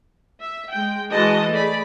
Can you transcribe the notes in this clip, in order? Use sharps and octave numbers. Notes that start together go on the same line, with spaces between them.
E5
G#3 G5
E3 G#3 F#4 D#5 A5
A3 G#4 D5 B5